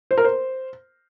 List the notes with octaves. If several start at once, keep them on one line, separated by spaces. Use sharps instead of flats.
C5
A#4
C5